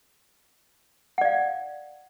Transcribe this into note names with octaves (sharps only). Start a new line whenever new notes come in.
D5 F5 F#5